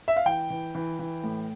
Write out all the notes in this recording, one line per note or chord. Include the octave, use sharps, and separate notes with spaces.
E5
F5
E3 G5
E3
E3
E3
A2